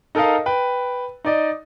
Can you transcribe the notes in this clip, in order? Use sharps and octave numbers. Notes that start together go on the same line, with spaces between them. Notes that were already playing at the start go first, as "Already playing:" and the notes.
D#4 A4 A#4 D#5 F5
B4 G5
D#4 D5 D#5